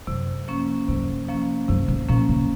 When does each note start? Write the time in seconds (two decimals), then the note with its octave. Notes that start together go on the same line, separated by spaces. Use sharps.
0.07 F#2 C3
0.48 F3 A#3 C#4
0.88 F#2 C3
1.28 F3 A#3 C#4
1.68 F#2 C3
1.88 G#2
2.09 A#2 F3 A#3 C#4
2.29 C#3